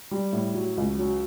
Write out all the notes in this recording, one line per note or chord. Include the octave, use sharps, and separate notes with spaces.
G3
A2
F#3
C#2
F#3